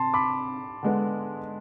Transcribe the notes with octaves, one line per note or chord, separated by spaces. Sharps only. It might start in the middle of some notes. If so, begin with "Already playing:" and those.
Already playing: C3 A5 C6
B5 D6
D3 G#3 B3